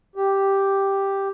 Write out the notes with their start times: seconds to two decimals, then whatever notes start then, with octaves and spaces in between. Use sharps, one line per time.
0.16 G4